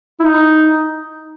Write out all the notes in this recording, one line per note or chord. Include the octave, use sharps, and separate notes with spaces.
E4
D#4